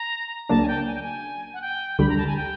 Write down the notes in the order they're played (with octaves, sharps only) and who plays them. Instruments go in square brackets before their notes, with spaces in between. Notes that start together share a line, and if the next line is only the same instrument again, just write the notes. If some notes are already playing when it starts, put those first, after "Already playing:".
Already playing: [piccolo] A#5
[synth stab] C#2 C#3 F#3 A#3 D4 [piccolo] A5
[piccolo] G#5
G5
G#5
G5
G#5
F#5
G5
[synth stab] D2 D3 G3 [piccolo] B5
[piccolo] A#5
A5
G#5
G5